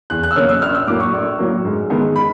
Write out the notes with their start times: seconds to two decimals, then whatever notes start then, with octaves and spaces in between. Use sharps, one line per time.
0.10 E2 F#6
0.23 F#6
0.31 E6
0.36 B2 F#3 A#3 C#4 F6
0.49 E6
0.62 A#1 F6
0.75 E6
0.87 A2 F#3 A#3 D6
1.00 C#6
1.13 A#1
1.38 A2 F#3 A#3
1.65 G#2
1.90 D#3 G#3 B3
2.16 B5